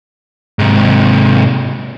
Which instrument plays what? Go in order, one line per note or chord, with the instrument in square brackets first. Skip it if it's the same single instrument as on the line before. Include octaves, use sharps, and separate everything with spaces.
[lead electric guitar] G#2 C3